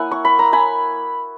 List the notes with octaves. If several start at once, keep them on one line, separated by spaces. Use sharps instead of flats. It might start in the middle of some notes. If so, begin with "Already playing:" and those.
Already playing: A#3 E4 F#5 G#5
C#6
B5
A#5
G#5 B5